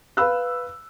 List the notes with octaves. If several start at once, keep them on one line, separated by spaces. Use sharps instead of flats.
B4 F5 B5 E6 F#6